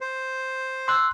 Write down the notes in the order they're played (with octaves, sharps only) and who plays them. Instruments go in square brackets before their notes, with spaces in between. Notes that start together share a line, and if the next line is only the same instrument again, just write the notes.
[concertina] C5
[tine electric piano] C6 F#6 [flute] E6